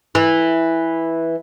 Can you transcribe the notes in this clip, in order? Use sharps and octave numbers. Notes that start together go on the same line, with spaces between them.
E3